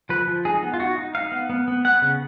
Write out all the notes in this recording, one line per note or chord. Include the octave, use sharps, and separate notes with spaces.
F3 B4
F3
D#4 G#4
B3
F4
D#4 F#4
D#4
D#4 F5
B3
B3
B3
B3 F#5
C#3